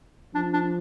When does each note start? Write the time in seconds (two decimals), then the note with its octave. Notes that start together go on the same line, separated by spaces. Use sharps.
0.35 F3 D4
0.54 D4